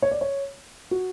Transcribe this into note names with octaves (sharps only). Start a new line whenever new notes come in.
C#5
D5
C#5
F#4